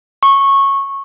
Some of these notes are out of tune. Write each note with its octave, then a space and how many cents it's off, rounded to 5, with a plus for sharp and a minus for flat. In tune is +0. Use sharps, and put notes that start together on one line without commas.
C#6 -15